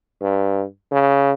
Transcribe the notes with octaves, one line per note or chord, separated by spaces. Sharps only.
G2
C#3